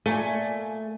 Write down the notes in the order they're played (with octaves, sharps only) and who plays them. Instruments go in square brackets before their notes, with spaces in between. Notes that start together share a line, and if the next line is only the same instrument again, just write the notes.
[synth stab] A#2 G#5 [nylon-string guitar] A3